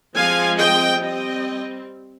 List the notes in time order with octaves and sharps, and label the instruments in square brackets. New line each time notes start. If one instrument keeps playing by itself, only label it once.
[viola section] F3 G#3 C4 F5 G#5
D#5 G5
G3 C4 D#5 G5